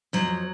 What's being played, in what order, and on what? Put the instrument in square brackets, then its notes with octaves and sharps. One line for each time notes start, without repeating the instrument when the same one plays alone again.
[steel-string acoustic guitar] F2 F#3